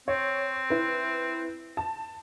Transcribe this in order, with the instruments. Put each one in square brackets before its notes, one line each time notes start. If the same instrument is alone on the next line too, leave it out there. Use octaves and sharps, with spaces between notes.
[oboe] C4 [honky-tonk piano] C#5
[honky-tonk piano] E4 B4
A5